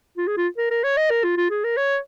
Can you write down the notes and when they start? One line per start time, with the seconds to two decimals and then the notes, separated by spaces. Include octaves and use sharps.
0.17 F4
0.27 G#4
0.37 F4
0.57 A#4
0.71 A#4
0.84 C#5
0.97 D#5
1.10 A#4
1.24 F4
1.37 F4
1.50 G#4
1.64 A#4
1.77 C#5